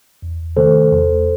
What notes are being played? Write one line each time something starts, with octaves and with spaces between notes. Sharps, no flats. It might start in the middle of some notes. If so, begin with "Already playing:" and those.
E2
C3 D#3 A3 A4 C5
E2